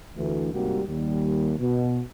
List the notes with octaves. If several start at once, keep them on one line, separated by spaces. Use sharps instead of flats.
D2 E3
G#2 C3 G3 A#3 F#4 G4
D#2 G3
B2